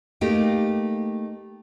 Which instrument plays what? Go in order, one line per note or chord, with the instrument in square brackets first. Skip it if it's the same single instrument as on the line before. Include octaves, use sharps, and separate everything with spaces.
[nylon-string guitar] A3 A#3 D#4 G4